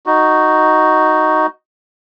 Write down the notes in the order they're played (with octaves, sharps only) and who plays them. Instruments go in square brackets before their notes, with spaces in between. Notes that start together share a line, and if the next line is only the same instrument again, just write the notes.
[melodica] D#4 F#4